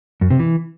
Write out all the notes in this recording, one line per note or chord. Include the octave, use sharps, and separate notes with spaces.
F#2
C3
E3